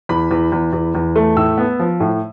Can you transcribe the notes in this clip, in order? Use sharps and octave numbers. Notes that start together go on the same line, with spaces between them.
E2 B5
E2
E2
E2
E2
A3
A2 E6
B3
F3
A2